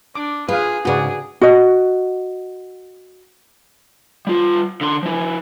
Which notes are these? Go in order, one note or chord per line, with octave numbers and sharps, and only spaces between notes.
D4 D6
F4 G#4 B4 F5
G#2 C#3 F#4 G#4 B4 D5
F#4 D#5
G3 F4
D3 C6
F3 E4